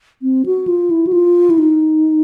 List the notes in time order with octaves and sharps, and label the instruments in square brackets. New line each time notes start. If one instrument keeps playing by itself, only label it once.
[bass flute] C4
F#4
F4
E4
F#4
F4
E4
D#4